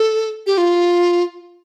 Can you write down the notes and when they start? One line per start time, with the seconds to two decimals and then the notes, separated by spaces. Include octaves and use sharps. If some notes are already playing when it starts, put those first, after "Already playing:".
Already playing: A4
0.46 G4
0.58 F4